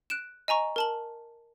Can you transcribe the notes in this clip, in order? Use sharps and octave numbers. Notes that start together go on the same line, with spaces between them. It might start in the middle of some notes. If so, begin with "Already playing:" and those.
F#6 D7 E7
D#5 G#5 A#5 C#6
A#4 A5 F#7